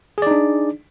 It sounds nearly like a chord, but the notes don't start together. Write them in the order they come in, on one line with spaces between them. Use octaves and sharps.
G#4 D5 D#4 D4